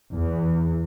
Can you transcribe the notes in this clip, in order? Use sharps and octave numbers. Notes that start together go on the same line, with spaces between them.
E2